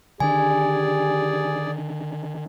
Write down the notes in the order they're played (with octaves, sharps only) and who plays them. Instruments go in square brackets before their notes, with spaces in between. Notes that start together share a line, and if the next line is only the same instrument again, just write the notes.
[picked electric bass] D3 D#3 D4 [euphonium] G4 [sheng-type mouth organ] G#4 D5 [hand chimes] G#5